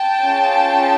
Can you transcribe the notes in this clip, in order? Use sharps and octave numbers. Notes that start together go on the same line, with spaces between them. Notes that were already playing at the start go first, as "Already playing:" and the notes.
Already playing: G5 A5
C#4 F4 G#4